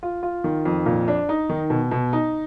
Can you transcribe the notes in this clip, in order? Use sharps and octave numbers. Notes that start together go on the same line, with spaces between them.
F4
F4
D#3
F2
A#2
D4
D#4
D#3
B2
B2
D#4